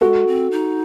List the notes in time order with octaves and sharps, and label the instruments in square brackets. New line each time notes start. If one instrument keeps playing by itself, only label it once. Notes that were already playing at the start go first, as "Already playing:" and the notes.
[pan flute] G#3 [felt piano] F#4 A4
[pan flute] C4
D#4